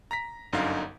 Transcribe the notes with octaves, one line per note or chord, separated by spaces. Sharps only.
A#5 A#6 B6
G1 F#2 D3 D#4 F5